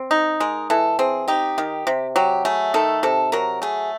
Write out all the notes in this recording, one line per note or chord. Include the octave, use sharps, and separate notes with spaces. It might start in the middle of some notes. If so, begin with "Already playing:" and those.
Already playing: C4
D#4
G#3 A#4
E3 A4
C4 G#4
D#4 G4
D#3
C3
F#3 G4
A3 G#4
D#3 A4
C3 A4
F#3 A#4
A3 G#4